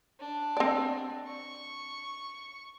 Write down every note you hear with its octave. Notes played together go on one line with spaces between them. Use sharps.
D4
C4 D5
C#6